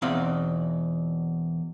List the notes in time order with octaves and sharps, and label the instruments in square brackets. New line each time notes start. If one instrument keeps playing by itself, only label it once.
[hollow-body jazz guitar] E2 B2 C4 D#4 D5 F5